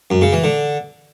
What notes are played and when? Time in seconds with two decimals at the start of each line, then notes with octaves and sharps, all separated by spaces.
0.10 F#2
0.22 C#3
0.33 E3
0.44 D3